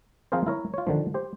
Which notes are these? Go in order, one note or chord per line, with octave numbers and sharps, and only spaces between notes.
F3 C4 F4 G#4 A#4 C5
E4 A#4 C#5
F4 C#5
D3 D#3 F3
G4 C5